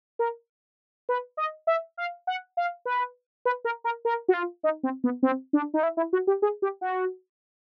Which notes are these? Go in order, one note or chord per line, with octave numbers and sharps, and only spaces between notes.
A#4
B4
D#5
E5
F5
F#5
F5
B4
B4
A#4
A#4
A#4
F#4
F4
D#4
C4
B3
C4
D4
D#4
E4
E4
F#4
G4
G#4
G4
F#4